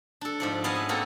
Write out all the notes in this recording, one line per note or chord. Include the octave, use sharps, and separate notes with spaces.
D4 A4
G#2 F3 D5
B3 C#4 D5 D#5 F5 G#5
E5
A#3 C4 F#4 A4